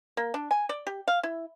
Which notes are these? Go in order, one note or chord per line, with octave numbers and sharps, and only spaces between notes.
A#3
D4
G#5
D5
G4
F5
E4